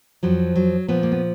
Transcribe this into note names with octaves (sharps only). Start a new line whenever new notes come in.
F2 F3 F#3
F#3
A#2 F3 B3
A#3
B3